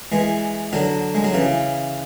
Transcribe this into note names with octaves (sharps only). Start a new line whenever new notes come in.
E3 G#3
D3 F#3
G#3
F#3
C#3 E3